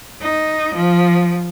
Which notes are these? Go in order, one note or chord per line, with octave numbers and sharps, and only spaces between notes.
D#4
F3